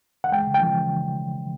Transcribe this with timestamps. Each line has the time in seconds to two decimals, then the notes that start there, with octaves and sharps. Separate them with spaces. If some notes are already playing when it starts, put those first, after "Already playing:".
0.24 F#5
0.32 G#3 G5
0.47 C#3
0.54 G5
0.61 F3